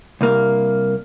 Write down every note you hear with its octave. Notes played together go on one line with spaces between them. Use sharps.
C2 A#3